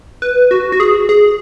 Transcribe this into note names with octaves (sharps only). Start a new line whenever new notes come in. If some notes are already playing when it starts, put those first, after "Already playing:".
B4
F#4
F#4
G#4
G#4